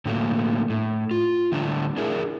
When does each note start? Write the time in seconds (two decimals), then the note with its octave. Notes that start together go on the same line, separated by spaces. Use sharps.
0.05 A2 D3 F#3 A3 A#3
0.70 A2
1.11 F4
1.52 A2 D3 G3 D4 A#5
1.97 D4 E4 G#4 A#4 E5